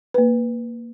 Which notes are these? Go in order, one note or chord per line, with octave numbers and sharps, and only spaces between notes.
A#3 B4